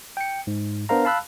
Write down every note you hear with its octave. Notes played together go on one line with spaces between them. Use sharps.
G5 C#7
G#2
B3 D4 A#4 C5 F5 A#5
F5 A5 B5 E6 F#6